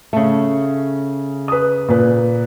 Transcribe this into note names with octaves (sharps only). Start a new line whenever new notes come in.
C#3 A3
B4 D#6
A#2 B4